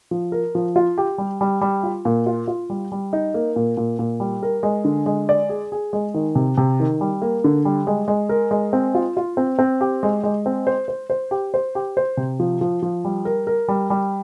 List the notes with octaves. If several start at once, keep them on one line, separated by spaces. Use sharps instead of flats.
F3
A#4
F3
F4
G4
G3
G3
G3
F4
A#2
F4
F4
G3
G3
D#4
A#3
A#2
A#2
A#2
G3
A#4
G#3
D3
G#3
D5
G#4
G#4
G#3
D#3
C3
C3
D#3
G3
A#3
D3
G3
G#3
G#3
A#4
G#3
C4
F4
F4
C4
C4
G4
G#3
G#3
C4
C5
C5
C5
G4
C5
G4
C5
C3
F3
F3
F3
G3
A#4
A#4
G3
G3